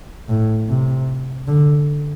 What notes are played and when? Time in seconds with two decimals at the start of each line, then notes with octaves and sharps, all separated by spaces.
0.29 A2
0.69 C3
1.48 D3